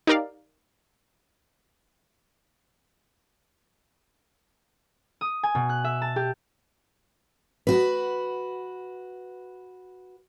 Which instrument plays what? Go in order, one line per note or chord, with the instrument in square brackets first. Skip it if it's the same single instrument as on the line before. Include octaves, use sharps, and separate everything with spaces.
[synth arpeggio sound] D#4 G4 A#4 D5 F5
[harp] D#6
G#5
B2
F#6
E5
A5
G4
[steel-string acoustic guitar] F#4 B4